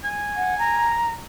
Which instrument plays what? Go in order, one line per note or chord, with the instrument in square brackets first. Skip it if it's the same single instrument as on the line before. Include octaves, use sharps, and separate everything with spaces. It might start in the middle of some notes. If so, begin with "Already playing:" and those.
[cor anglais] G#5
[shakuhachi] F#5
A#5